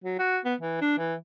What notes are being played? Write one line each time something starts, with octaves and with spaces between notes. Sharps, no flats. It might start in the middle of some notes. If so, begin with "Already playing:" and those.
F#3
F#4
B3
E3
D4
E3